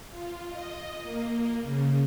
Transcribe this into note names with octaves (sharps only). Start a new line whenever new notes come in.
F4
D#5
A#3
C#3